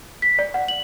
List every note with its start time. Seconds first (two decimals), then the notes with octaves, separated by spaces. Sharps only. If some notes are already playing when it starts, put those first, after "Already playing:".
0.22 B6
0.39 D5
0.54 F#5
0.68 F#7